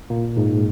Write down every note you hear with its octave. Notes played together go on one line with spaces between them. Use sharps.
A#2 A#3
G#2 G#3